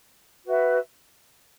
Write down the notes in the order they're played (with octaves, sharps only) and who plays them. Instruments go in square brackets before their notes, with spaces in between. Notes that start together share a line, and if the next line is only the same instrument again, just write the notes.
[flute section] F#4 B4 E5